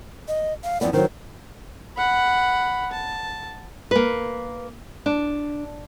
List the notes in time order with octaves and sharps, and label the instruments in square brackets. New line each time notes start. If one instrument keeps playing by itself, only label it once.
[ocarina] D#5
F5
[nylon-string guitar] F2 E3 B3 [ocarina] D5
[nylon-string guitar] D#3 F#3 [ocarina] C5
[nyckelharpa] F#5 B5
A5
[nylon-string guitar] A#3 B4
D4